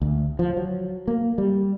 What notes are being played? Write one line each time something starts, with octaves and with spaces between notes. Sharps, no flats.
D2
F3
F#3
A#3
G3